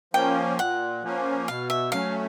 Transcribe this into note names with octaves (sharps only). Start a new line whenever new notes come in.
F3 A#3 C#4 G5
A#2 F#5
F3 A#3 C#4
B2 F5
E5
F#3 A3 C#4 F5